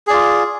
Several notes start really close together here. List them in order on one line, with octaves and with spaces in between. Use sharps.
G#4 D5 F4